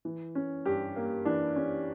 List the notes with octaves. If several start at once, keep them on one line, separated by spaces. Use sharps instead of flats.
E3
C#4
G2 G4
A#3
E3 D4
C#4